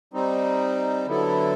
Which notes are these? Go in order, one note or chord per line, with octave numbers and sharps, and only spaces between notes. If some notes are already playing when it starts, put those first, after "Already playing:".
G3 C4 D#4
D3 F#3 B3 E4 A4